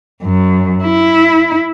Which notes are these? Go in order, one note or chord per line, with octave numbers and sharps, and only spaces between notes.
F#2
E4